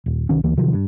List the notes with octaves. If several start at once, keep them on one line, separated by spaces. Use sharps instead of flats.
D#1
C2 D#3 C#4
D2 E3 A#3
C3 D#3 F3 F#3
G2